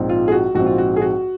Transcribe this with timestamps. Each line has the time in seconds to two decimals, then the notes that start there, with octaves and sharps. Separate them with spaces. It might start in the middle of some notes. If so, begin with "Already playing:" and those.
Already playing: A#1 G#2 F3 C4
0.09 F4
0.28 G#4
0.32 F#4
0.55 A#1 G#2 F3 C4 F#4
0.66 F4
0.78 F#4
0.96 G#4
1.02 F#4